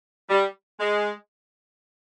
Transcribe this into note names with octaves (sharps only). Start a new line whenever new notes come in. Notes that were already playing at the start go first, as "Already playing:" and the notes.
G3
G#3